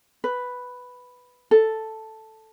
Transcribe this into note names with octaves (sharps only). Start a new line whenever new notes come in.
B4
A4